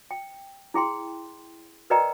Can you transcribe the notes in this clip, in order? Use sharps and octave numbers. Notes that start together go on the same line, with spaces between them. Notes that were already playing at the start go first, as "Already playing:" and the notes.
G5
E4 G#4 G5 C6
A#4 B4 D5 D#5 G5 A#5